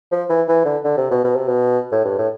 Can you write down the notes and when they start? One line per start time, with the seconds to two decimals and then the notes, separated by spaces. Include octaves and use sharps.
0.12 F3
0.30 E3
0.48 E3
0.65 D3
0.84 D3
0.97 C3
1.11 B2
1.24 B2
1.36 C3
1.48 B2
1.92 A2
2.05 G2
2.18 A2